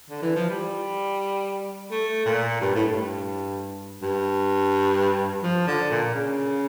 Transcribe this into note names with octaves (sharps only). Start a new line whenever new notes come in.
D3
E3
F3
G3
A3
A#2
G2
A2
G2
G2
F3
D3
A#2
C#3